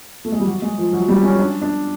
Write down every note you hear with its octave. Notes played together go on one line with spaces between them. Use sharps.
A3
G#3
G3
F#3
G#3
F3
F#3
G3
C#4
D4
D4